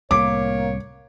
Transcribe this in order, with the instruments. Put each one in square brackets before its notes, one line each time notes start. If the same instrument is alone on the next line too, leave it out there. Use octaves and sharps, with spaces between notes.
[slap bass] C2 A2 [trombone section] A#3 [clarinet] C#5 [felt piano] D6